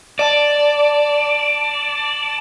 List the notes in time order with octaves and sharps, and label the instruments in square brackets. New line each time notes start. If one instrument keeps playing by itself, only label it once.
[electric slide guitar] D5 [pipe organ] A5